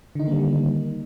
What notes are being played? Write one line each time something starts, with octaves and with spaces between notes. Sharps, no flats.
D3 D#3 G3 A#3 D#4